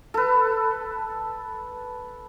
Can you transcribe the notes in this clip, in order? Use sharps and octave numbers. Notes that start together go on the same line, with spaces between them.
A4 B4